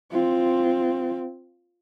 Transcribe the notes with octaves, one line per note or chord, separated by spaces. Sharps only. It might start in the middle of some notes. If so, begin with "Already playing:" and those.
C4 F4